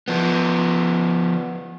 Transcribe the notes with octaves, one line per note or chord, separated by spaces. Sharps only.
F3 B3